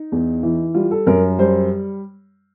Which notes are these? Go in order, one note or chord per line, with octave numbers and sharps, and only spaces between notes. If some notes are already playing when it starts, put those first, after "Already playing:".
Already playing: D#4
E2
E3
G3 F4
A4
F#2 A#4
G3 C5